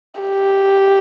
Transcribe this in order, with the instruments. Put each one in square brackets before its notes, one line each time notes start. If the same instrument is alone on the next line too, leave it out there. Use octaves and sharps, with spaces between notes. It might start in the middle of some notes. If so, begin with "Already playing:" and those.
[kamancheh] G4